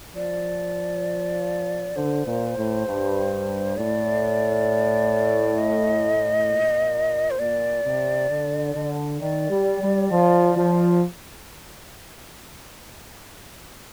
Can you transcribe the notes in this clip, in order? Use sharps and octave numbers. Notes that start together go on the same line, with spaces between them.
F3 D5
D3 C5
A#2
A2
G2
A2 D5
D#5
A#2
C5
A#2 D5
C3
D3
D3
D#3 D5
G3
G3
F3
F3